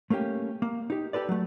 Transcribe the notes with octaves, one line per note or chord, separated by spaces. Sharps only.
A3 A#3 C#4 G4 G5
A#3
D#4 G4
G4 A4 B4 D5
F#3 A3